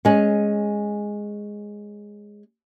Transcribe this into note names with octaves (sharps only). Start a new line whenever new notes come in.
G#3 C#4